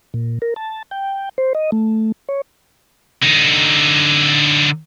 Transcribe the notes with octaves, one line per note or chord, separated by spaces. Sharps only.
A#2
A#4
A5
G5
C5
D#5
A3
C#5
D3 D#4